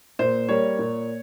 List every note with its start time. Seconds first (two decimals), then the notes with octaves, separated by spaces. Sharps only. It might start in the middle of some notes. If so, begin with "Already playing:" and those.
0.19 A#2 C5
0.49 G3 A#3 C#5
0.79 A#2